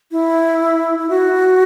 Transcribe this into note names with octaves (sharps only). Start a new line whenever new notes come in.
E4
E4
F#4